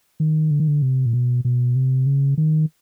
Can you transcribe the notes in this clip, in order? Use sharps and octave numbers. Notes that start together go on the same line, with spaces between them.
D#3
D3
D#3
D3
C3
A#2
B2
B2
C3
C#3
D#3